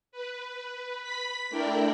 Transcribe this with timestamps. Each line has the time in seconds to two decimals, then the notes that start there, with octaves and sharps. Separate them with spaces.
0.12 B4
1.03 B5 B6
1.49 A3 D4 E4 A#4 D5 G5